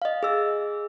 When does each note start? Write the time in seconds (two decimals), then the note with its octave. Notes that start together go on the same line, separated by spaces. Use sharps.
0.02 D#5 F5
0.23 G#4 E6